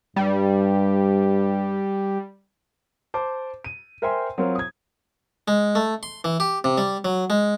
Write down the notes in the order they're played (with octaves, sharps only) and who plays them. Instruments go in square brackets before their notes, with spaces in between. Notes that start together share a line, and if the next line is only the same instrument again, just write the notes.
[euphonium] G2 [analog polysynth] G3
[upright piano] C5 A5 D6
D#7
A#4 C5 E5 G5 G#5 C6
F#3 C4 F4 A#4 C5
D#6 G#6
[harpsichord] G#3
A3
C6
E3
G4
C3
G3
F#3
G#3